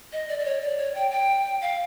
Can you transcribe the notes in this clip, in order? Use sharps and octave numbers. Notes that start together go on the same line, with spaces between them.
D#5
D5
D5
C#5
D5
C#5
G5
G5
F5